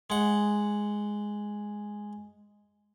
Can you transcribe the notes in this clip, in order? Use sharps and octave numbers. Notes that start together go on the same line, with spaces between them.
G#3 F#5